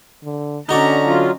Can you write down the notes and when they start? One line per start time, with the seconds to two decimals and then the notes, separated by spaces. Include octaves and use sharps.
0.23 D3
0.69 D3 C#4 D#4 F#4 D5 A#5
1.04 F#3 F4